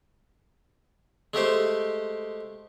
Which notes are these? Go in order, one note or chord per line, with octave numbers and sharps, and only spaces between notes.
G#3 A3 G4 C5